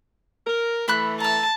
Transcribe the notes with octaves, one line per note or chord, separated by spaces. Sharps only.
A#4
E3 A3 E5 B5 F#6
A5 A#5 E6